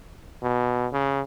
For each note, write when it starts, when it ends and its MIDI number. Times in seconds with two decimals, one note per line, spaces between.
0.42 0.87 47
0.93 1.21 49